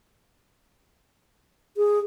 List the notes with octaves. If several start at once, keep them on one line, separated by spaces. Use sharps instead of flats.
G#4